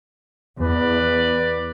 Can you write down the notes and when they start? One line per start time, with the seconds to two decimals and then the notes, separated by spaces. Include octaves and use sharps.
0.59 E2 B4 D5